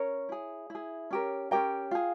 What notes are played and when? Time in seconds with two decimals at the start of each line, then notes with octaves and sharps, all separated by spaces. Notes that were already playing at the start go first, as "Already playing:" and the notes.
Already playing: C#4 A#4 C#5
0.29 E4 G#4
0.70 E4 G#4
1.11 C#4 G4 A#4
1.51 C#4 G4 A#4 G5
1.91 F4 G#4